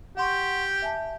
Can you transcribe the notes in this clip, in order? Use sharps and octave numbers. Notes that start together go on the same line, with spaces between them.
G4 F#5 C6 C#6
E5 G#5 A5